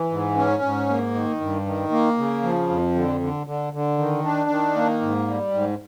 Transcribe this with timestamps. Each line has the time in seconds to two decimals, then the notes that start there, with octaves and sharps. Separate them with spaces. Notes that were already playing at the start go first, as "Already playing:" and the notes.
Already playing: E3
0.11 G#2
0.37 C#4
0.63 G#2
0.89 A#3
1.14 D#3
1.41 G2
1.66 D#3
1.91 A#3
2.18 C#3
2.43 F3
2.70 F2
2.95 D3
3.21 D3
3.47 D3
3.73 D3
3.98 D#3
4.24 D4
4.50 D#3
4.76 A#3
5.01 G#2
5.28 G3
5.54 G#2